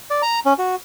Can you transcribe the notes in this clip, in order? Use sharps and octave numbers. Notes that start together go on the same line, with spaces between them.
D5
A#5
C#4
F#4